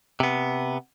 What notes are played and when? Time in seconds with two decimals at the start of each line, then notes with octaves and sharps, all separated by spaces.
0.20 C3 B3